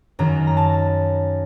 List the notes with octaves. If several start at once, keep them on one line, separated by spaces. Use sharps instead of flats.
F#2 D#3 F#3 A#5
A#5
A5